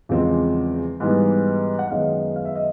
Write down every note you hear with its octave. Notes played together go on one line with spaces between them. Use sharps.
E2 C#3 F3 G#3 C4
G#2 E3 G3 B3
F#5
F#2 D#3 G#3 B3 D#5 F5
F5
E5
D#5